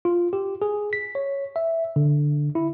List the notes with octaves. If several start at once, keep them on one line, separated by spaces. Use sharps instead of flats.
F4
G4
G#4
B6
C#5
E5
D3
E4